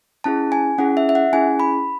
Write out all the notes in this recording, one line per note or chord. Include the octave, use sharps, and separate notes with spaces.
C#4 E4 G#4 A5
G#5
C#4 E4 G#4 F#5
E5
E5
F#5
C#4 E4 G#4 G#5
B5